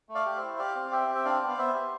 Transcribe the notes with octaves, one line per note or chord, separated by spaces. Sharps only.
A3
D5 F5
G4
E4 C5 E5
G4 D5 F5
C4
G4 E5 G5
C4
E5
D4 D5 F5
B3
F5
B3 C5 E5
G4